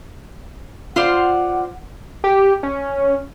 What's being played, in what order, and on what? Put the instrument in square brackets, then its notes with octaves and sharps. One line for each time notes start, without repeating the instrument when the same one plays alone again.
[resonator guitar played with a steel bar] F4 C5 D5 [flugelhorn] F#5
[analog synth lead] G4
C#4